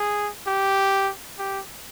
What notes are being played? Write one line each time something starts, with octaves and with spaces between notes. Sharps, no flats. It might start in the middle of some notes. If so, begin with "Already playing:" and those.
Already playing: G#4
G4
G4